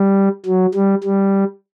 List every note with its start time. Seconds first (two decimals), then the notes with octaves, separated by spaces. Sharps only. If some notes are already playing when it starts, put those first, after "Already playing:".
Already playing: G3
0.46 F#3
0.74 G3
1.04 G3